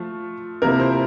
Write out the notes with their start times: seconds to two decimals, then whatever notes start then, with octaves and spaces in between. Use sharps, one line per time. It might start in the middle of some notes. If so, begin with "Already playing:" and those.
Already playing: F3 A3 F4
0.62 C3 F3 A#3 E4 A#4
0.80 C5